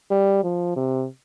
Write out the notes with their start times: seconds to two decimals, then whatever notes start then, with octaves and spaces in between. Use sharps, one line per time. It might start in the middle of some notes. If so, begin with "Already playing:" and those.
0.11 G3
0.43 F3
0.76 C3